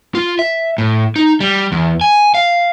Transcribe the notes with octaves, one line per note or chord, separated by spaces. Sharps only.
F4
E5
A2
D#4
G3
E2
G#5
F5